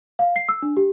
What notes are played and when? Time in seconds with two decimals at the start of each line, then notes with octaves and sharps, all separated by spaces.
0.19 F5
0.36 C7
0.49 E6
0.62 D4
0.77 G4